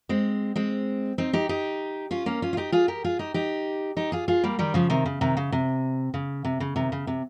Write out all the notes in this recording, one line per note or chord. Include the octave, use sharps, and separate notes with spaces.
G#3 C4
G#3 C4
C4 D#4
D#4 G4
D#4 G4
C#4 F4
A#3 C#4
C#4 F4
F4
D#4 G4
F4 G#4
G4 A#4
F4 G#4
D#4 G4
D#4 G4
D#4 G4
F4 G#4
F4 G#4
G3 A#3
D#3 G3
C#3 F3
C3 D#3
C#3
C3 D#3
C#3
C3
C#3
C3
C#3
C3 D#3
C#3
C3